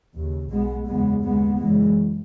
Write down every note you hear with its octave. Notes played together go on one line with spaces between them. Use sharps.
D#2 C#3
B1 B2 G#3 B3
F#1 E2 C#3 G#3 B3
D#2 C#3 G#3 B3
F#1 F#2 C#3 E3 G#3